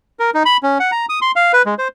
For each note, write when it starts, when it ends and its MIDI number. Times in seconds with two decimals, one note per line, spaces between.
0.19 0.30 70
0.34 0.43 63
0.46 0.57 83
0.63 0.78 61
0.80 0.91 78
0.92 1.06 82
1.09 1.19 87
1.22 1.32 84
1.36 1.52 77
1.53 1.62 71
1.66 1.74 56
1.79 1.88 72